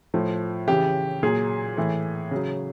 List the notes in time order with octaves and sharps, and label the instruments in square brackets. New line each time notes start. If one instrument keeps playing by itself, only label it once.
[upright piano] A2 F3
C#3 E3 G4
A#2 F#3 G#4
A2 E3
C#3 F#3